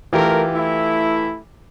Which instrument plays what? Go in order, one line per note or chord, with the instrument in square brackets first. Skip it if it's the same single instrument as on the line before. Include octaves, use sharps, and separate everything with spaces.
[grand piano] E3 F4 G4 [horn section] A3 A#4
[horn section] A3 E4